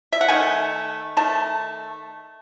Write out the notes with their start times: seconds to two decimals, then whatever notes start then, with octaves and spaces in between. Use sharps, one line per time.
0.13 E5
0.21 F#5
0.28 D#3 A3 G#5
1.17 D#3 A3 A5